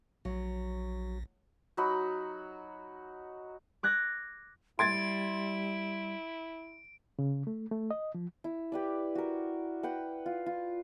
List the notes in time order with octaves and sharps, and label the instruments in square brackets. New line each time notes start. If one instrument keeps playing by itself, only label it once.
[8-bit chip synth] A#1 [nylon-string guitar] F#3
[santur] F#3 D#4 F#4 B5
[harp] D6 F#6 G#6 A#6
[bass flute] G3 [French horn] E4 [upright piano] C6 G#6 A6 [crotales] D7
[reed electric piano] C#3
A3
A3
D#5
F3
[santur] E4
G4 B4 D5
F#4 A#4
B4 F#5 G5
F4
F4